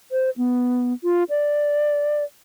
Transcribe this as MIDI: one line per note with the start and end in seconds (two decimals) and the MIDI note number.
0.12 0.30 72
0.37 0.93 59
1.04 1.24 65
1.30 2.24 74